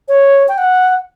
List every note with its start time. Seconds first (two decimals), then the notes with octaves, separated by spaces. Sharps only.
0.08 C#5
0.48 G5
0.58 F#5